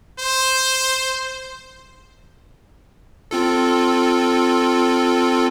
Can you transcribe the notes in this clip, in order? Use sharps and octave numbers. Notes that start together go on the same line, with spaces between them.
C5
C4 F4 A4